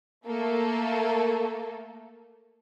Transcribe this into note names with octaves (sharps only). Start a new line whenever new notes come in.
A3 A#3 A4